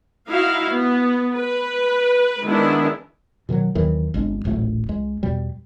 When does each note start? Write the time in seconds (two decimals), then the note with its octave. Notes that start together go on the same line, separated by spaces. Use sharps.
0.28 D#4 E4 F#4 F5
0.71 B3
1.33 B4
2.44 D#3 G#3 B3 D4 E4
3.49 B2 D#3 F3 F#3
3.75 D#2 D#3 E3 F#3
4.14 G1 C2 G#3 D4
4.45 D1 A1 A#2 A3
4.89 C#2 G#3
5.23 E2 B2 G3